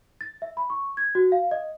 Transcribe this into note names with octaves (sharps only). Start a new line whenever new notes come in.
A6
E5
B5
C#6
G#6
F#4
F5
D#5